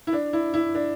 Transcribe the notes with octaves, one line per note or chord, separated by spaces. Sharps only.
E4
D4
E4
E4
D4